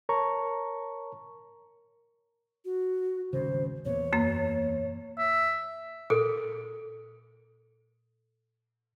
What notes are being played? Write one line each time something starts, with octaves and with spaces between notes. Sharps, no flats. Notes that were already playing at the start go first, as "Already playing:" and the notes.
A#4 C#5 A5 A#5 C#6
F#4
D#1 G#1 C#3 C5
E2 A#2 B3 C#5
F#2 A#3
E5
A#2 A4